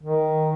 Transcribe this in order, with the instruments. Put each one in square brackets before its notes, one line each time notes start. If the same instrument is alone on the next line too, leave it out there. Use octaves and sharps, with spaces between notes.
[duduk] D#3